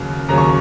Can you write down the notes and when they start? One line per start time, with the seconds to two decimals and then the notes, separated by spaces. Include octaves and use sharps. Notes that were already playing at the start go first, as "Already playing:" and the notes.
Already playing: D#2 C#3 F#3
0.28 D#2 C#3 F#3 A#5
0.38 C#6